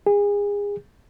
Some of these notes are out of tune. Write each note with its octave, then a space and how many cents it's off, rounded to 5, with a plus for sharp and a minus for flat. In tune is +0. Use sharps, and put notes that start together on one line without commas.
G#4 -30